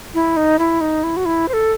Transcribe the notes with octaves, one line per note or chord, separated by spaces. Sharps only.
E4
D#4
E4
D#4
E4
F#4
E4
C5
A4